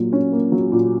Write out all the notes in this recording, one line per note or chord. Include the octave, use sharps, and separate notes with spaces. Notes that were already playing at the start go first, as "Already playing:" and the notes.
Already playing: A#2 F#3 A#3
C#4
A#3
F#3
A#2